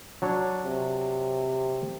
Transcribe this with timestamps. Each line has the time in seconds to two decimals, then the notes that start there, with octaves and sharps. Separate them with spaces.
0.22 F#3 D4 C#5
0.65 C3